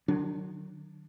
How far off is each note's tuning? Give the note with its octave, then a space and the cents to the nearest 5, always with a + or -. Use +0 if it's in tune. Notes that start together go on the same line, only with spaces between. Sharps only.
D#3 -45 F#3 +0 D4 +0